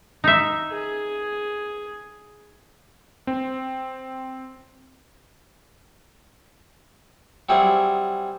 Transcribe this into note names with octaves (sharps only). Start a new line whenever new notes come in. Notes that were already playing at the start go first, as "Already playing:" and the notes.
D#4 E5
G#4
C4
F#3 G3 C4 E4 G#4